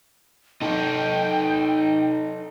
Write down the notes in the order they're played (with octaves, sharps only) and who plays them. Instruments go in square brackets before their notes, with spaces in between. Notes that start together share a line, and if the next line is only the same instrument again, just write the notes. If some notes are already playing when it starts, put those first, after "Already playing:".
[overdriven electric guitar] D#4 A4 [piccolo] G5